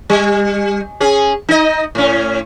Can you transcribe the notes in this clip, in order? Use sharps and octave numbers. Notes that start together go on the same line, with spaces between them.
G3
C#4 G#4
D#4 D#5
A2 C#4